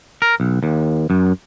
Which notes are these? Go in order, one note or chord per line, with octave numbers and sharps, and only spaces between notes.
A#4
B1
D#2
F#2